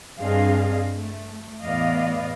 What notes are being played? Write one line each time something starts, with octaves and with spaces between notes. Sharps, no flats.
G2 C4 D4 G#4 D#5 F5
A3
E2 A2 B3 D5 D#5 F5